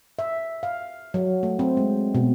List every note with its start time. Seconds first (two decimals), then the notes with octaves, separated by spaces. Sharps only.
0.19 E5
0.63 F5
1.14 F#3
1.43 A3
1.59 C4
1.77 G#3
2.15 B2